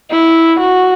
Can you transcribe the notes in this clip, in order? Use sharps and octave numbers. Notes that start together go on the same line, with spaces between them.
E4
F#4